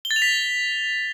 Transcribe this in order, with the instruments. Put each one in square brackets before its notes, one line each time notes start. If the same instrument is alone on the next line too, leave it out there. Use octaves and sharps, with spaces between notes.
[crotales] G7
A6
F7
B6